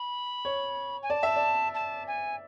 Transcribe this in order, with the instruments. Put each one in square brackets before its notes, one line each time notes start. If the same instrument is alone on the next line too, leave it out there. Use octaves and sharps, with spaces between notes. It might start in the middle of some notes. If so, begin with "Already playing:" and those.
Already playing: [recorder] B5
[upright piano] C#5
[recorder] G#5
[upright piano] D5 [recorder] A5
[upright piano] E5
D5
[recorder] A5
G#5